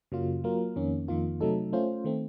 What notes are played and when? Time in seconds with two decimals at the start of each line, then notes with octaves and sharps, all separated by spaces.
0.12 F#2 C#3 F#3 A#3 F4
0.44 F#3 A#3 F4 A#4
0.76 F2 D#3 A#3 C#4
1.08 F2 D#3 A#3 F4
1.41 C3 F#3 A3 D#4 A4
1.73 A3 C#4 F4 C5
2.05 D#3 A3 C4